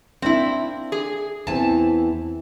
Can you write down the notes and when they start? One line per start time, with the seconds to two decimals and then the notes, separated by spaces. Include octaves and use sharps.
0.22 A#3 C4 D4 E4
0.92 G#4
1.47 E2 E3 C4 G#5 A5